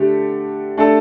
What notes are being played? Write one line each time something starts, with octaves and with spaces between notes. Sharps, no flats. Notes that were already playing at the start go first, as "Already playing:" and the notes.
Already playing: D3 A3 G4
A3 D4 A4